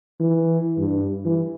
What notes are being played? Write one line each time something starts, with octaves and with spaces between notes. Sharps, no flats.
E3
G2
E3